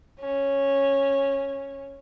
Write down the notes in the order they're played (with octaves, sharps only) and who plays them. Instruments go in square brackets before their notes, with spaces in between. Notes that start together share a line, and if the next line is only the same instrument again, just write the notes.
[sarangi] C#4